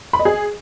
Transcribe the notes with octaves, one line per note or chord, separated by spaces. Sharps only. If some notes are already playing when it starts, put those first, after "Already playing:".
B5
D#5
G#4